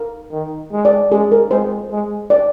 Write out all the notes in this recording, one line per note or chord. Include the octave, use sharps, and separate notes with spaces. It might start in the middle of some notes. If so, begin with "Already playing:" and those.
Already playing: A#4
D#3
G#3
D5
G#3 G#4
A#4
G#3 C5
G#3
D5